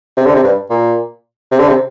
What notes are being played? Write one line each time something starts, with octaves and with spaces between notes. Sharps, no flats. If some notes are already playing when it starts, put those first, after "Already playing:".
C3
D3
C3
G2
A#2
C3
D3
C3